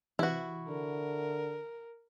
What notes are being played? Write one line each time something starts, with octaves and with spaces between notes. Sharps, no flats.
C3 E3 E4 F#4
D3 A#4